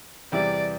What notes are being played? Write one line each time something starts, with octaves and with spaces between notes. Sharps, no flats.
E2 C3 E3 G3 E4 D5